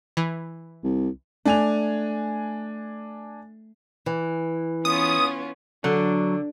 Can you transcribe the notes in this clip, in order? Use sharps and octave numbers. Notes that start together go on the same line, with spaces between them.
E3
C2
A3 D4 G#5 F7
E3
B3 C#4 F4 D#6
D3 F#3 D4 A4